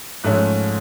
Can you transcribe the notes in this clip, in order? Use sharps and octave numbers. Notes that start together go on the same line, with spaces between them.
G#2 F3 A3 C#4 F#6